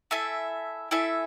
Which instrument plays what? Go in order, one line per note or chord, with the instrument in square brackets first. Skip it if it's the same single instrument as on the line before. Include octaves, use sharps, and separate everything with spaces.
[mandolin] E4 A4 E5 G#5
E4 A4 E5 G#5